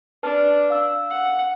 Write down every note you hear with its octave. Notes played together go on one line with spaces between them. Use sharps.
D4 B4 A5 F6
F5 E6
F#5